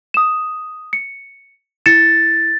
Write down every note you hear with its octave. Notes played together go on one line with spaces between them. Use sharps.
D#6 E7
C#7
E4 A6 C#7 E7